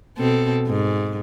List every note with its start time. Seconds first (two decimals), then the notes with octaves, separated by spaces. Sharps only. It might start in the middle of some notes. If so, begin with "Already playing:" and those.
0.18 B2 C4 A4
0.67 G#2